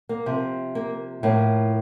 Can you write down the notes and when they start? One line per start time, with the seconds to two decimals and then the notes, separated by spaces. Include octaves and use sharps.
0.09 A#3
0.26 C3 F3
0.75 A#3
1.23 A2 F3 A#3